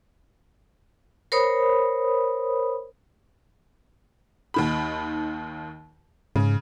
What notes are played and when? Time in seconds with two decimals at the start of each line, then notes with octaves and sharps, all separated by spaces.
1.32 A#4 C5 C#5 B5 D#6
4.54 D#2 D#3 B5
6.36 G#2 C#3